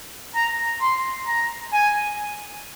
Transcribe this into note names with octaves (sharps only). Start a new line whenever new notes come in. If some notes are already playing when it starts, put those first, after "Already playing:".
A#5
C6
A#5
G#5